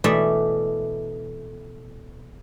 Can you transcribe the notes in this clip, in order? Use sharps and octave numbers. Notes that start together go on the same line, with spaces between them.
B2 E3 A3 D5 E5